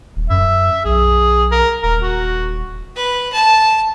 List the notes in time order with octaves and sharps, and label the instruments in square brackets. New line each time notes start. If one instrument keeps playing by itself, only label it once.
[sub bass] D#1
[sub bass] F#2 [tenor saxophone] E5
[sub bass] B1 [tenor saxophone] G#4
[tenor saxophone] A#4
[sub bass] D#1 [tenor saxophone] A#4
[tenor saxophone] F#4
[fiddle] B4
A5